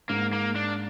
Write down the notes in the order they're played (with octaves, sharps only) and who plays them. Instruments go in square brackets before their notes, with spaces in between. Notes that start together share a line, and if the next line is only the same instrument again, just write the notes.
[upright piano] G#2 [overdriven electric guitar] A#3
[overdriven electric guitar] A#3
D4